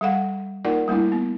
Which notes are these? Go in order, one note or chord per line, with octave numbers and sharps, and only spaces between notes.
G3 A4 F5 F#5
A#3 D#4 F4 A#4 D5 F#5
G3 A3 A#3 D4 E4
B3